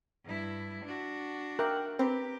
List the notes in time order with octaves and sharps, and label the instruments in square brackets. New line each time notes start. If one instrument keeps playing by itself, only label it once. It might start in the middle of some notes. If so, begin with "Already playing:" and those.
[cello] G2 E4
D4 F#4
[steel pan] A#4 E5 [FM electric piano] G5 D6 F#6
[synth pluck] C4 [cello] G4 [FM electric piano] B4 A#5